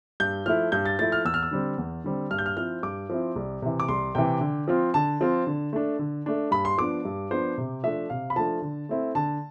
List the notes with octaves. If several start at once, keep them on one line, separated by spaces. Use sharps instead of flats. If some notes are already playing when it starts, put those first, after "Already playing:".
G2 G6
F3 A3 E4 F6
G2 G6
A6
F3 A3 E4 A6
F6
E2 E6
F6
E6
D3 G3 C4
E2
D3 G3 C4
G2 F6
G6
F6
F3 C4 E4 F6
G2 D6
F3 C4 E4
C2
C3 E3
D6
C2 C6
C3 E3 G5
D3
F3 C4 F4
D3 A5
F3 C4 F4
D3
A3 D4
D3
A3 D4
G2 B5
C6
F3 B3 D4 D6
G2
F3 B3 D4 C5
C3
F3 A3 D4 E5
C3 F5
B5
F3 A3 D4 A5
D3
A3 C4 E4
D3 A5